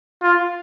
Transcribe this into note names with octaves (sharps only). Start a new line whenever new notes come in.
F4